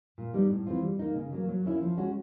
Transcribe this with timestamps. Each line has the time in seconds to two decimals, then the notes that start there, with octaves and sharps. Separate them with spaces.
0.18 A#2
0.34 G3 B3 D#4
0.50 A2
0.67 E3 G#3 C4 F4
0.83 G3
0.99 A#3 D#4
1.16 C#3
1.33 F#3 A#3
1.49 F#3
1.65 A#3 C#4 E4
1.81 F3
1.97 G#3 C#4 F#4